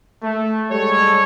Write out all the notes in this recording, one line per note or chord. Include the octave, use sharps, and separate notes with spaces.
A3
G3 G#3 A4 C#5